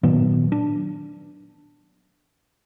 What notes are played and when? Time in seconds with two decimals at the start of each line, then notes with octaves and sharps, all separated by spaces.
0.03 A#2 D#3 F#3 B3
0.52 D4